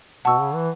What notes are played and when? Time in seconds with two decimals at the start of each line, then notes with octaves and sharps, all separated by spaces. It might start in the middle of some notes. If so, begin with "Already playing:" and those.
0.25 B2 F#5 A5 C#6 E6
0.40 C#3
0.54 E3